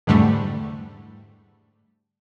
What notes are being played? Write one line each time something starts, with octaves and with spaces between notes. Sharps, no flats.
E2 G#2 D3 G3 A3